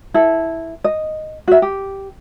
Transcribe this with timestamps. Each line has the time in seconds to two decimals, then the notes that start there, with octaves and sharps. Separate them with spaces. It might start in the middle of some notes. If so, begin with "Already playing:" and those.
0.14 E4 A4
0.84 D#5
1.48 F#4 E5
1.62 G4